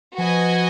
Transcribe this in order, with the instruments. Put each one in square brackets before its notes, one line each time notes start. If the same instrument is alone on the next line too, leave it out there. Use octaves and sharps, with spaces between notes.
[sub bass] F3 [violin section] F#4 B4 D#5 G#5